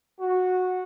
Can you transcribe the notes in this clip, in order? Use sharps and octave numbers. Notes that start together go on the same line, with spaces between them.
F#4